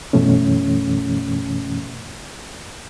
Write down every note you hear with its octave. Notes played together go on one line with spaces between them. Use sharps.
F#2 B2 E3 A3 C#4